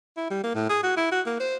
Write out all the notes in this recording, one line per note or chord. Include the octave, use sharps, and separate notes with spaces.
E4
G3
A#3
A2
G#4
F#4
E4
F#4
A#3
C5